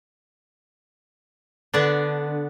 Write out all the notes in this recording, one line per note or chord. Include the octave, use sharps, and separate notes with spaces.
D3 B3 D4